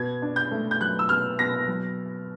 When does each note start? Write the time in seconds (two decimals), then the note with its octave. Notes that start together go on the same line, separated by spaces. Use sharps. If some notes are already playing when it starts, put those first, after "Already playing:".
Already playing: B2 G#6
0.22 D4
0.36 G6
0.51 A3
0.71 G6
0.81 F#3 F#6
0.99 E6
1.09 B2 F6
1.39 B2 A#6
1.68 F#3